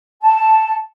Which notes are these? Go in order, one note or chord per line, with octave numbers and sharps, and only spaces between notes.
A5